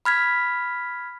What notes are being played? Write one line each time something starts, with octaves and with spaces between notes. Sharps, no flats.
B5 F6 G#6 B6